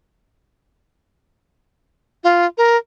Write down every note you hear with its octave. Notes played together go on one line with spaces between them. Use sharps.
F4
A#4